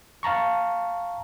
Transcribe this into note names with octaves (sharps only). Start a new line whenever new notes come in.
F5 A5 A#5 C#6